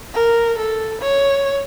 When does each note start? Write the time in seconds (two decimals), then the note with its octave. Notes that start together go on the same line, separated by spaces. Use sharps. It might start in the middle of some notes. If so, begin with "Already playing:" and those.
0.14 A#4
0.58 A4
1.01 C#5